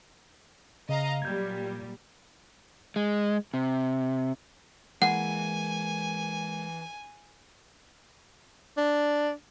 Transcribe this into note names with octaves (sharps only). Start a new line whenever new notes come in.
C#3 D#5 F5 A#5
A#2 F#3 G3 G6 G#6
G#3
C3
E3 G#3 A#3 F#5 G#5
D4